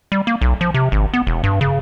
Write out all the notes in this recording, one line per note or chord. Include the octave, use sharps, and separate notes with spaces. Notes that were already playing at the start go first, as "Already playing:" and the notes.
G3
A#3
B1
F3
C3
G#1
B3
E1
G2
C#3